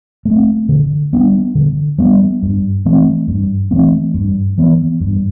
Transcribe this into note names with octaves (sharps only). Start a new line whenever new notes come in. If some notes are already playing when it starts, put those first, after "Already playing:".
A3 C4
D3
G3 B3 D4
D3
G3 B3 D4
G2
E3 A3 C4
G2
E3 A3 C4
G2
E3 B3
G2